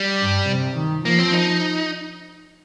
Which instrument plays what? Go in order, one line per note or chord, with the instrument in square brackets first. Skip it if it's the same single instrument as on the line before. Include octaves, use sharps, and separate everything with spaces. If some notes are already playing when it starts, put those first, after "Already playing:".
Already playing: [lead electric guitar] G3
[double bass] G2
C3
D#3
[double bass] F3 [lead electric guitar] A#3
[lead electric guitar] C4
D#4